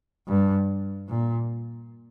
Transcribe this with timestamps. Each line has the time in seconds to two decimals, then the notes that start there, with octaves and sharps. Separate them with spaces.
0.27 G2
1.08 A#2